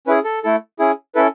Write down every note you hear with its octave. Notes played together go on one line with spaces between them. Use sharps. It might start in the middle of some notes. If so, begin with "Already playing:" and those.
C#4 E4 G#4 B4
A4
A3 E4 A4
C#4 E4 G#4
C#4 E4 A4 B4